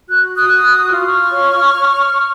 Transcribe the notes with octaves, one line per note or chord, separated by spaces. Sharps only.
F#4 F#6
D#6 F#6
F#4
F4 F6
D#6
C#6 F6
C#5